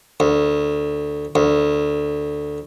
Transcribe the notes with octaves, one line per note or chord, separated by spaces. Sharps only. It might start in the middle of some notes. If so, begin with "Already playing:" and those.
D2
D2